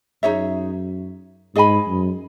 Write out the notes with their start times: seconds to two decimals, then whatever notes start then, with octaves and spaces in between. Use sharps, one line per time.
0.23 F#2 D#4 G#4 C#5 E5
1.55 G#2 G#4 D#5 G#5 B5
1.88 F#2